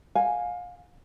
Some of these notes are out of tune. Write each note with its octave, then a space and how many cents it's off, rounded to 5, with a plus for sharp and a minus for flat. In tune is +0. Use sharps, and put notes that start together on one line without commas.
F5 +30 G#5 +0